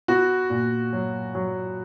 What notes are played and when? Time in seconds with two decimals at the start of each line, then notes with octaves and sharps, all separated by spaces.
0.08 B3 F#4
0.50 A#2
0.93 F#3
1.35 F#3